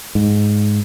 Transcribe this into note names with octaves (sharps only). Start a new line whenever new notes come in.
G#2